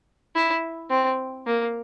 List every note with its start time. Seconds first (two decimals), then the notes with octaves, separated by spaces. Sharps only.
0.35 E4
0.90 C4
1.46 A#3